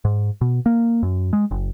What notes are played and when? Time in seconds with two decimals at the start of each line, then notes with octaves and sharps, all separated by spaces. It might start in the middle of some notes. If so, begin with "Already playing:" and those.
0.05 G#2
0.41 B2
0.66 A#3
1.03 F#2
1.33 G#3
1.51 F#1